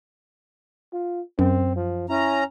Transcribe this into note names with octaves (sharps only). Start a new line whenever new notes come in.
F4
F#2 C4
F3
C#4 E4 A#5